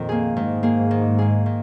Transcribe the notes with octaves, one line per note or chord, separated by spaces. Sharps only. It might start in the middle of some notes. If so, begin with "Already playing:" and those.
Already playing: F2 A#2 D#3
A#3 G#4
G#2 D#3
A#3 G#4
D#3
A#3 G#4
D#3